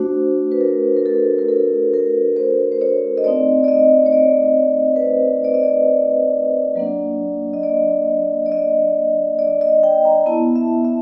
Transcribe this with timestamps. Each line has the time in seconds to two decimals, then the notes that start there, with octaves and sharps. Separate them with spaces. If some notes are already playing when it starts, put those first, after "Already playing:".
Already playing: A3 D4 F#4 C5
0.52 B4
0.61 A#4
0.97 A#4
1.06 A4
1.38 A#4
1.49 A4
1.94 A#4
2.36 C5
2.72 C5
2.81 C#5
3.18 D#5
3.24 A3 C4 D#4 D5
3.64 D5
3.68 D#5
4.06 C#5
4.12 D5
4.96 B4
5.00 C5
5.44 D5
5.54 D#5
5.63 D5
6.76 F#3 A#3 D4
7.53 D#5
7.63 D5
8.46 D5
8.52 D#5
9.39 D5
9.61 D#5
9.83 G5
10.05 A#5
10.26 B3 E4 A5
10.56 E5
10.85 E5